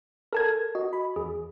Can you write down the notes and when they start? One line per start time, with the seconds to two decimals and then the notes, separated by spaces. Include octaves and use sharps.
0.33 A4 A#4 A5 G#6
0.75 F#4 D#5
0.93 B5
1.16 E2 G#4